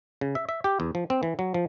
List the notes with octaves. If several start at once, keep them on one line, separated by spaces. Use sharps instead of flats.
C#3
E5
E5
G4
E2
F3
C4
E3
F#3
F3